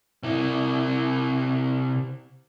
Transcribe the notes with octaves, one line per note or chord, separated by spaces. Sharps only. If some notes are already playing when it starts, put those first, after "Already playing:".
C3 E4